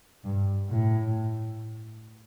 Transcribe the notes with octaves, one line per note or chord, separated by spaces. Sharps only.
G2
A2